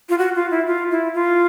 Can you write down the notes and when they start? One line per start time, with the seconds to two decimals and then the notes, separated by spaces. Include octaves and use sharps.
0.09 F4
0.18 F#4
0.35 F4
0.51 E4
0.67 F4
0.91 E4
1.15 F4